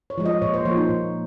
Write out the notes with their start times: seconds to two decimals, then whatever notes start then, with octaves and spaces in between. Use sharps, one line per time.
0.10 C#5
0.18 F3 G#3
0.26 D#5
0.42 A#2 C#5
0.54 C5
0.65 F3 A#3 C#5
0.77 D#4
0.89 A#2